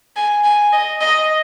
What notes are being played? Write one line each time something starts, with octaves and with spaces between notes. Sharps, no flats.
G#5
G#5
D#5
D#5